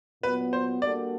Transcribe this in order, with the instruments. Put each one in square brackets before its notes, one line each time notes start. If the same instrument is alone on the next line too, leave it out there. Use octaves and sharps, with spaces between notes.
[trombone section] A#2 F#3 B3 [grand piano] B4
[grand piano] C5
[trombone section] G3 A#3 D4 F#4 A4 [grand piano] D5